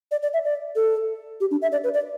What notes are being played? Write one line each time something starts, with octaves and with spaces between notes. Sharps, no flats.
D5
D5
E5
D5
A4
G4
D4
E5
D5
B4
D5